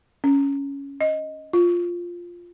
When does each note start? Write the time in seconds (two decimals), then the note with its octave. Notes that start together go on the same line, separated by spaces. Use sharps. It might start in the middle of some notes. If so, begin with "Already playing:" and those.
0.24 C#4
1.01 D#5
1.53 F4